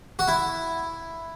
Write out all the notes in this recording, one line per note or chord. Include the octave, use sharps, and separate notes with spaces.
F#4
E4